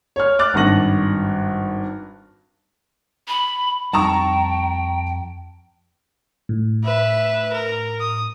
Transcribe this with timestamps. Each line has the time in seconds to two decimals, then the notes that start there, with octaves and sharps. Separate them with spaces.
0.16 C#5 F6
0.39 D6 F6 F#6 A6
0.54 G#1 G2 A5 C#6 A#6 F#7
3.28 B5
3.93 F2 G3 G5 A5 A#5 C#6
6.49 A2
6.84 B4 E5
7.53 A#4
8.00 D#6